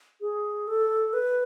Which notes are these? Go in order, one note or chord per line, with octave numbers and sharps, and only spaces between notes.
G#4
A4
B4